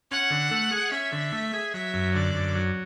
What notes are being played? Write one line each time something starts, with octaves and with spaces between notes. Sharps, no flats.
C#4 F#5
D3
A3
G#4
C#4 E5
D3
A3
G#4
F#3 E5
F#2
D3 D5
F#2
F#3